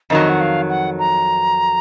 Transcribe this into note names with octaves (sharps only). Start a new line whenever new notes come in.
F2 D#3 F#3 D#5
F#5
F5
F#5
A#5